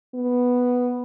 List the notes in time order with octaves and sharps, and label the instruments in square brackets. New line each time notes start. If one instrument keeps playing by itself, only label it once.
[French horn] B3